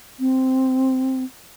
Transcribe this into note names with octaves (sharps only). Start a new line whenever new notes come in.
C4